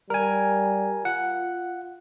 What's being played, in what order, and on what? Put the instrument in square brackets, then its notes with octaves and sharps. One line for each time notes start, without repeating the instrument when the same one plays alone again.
[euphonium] G3 [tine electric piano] A#4 G#5
[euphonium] F4 [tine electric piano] F#5